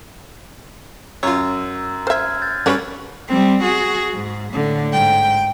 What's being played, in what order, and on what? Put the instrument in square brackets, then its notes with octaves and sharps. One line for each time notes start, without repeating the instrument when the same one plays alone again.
[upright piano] F#2 [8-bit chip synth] F4 C#5 [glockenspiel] E6
[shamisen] C5 E5 [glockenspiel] F6 G#6
[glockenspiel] G6 A6
[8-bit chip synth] G2 G3 B4 [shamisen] F#3 C#4 C#5
[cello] G3 C4
F#4 G#4
G#2
A2 D3
G#2 G5